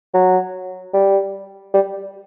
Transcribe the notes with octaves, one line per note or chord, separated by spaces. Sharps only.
F#3
G3
G3